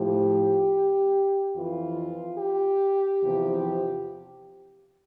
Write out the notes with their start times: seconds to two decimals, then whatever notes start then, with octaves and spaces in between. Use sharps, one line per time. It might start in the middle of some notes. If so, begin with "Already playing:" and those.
Already playing: A2 F3 G4
1.55 F2 E3 F4
2.39 G4
3.22 E2 C3 F3